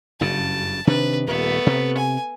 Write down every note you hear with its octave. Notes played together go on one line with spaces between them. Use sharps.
F#1 G2 C#3 A5
C3 D#3 D4 B4
D#1 A3 B3
C3
G#5